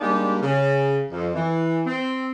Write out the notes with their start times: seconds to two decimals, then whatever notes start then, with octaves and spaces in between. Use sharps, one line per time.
0.01 G3 G#3 A#3 D4 D#4 G4
0.42 C#3
1.12 F2
1.35 E3
1.86 C4